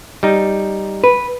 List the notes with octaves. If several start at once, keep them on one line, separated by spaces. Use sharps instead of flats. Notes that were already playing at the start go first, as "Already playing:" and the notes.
G3 D#4
B4